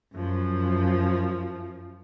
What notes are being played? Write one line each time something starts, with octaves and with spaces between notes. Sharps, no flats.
F#2 F3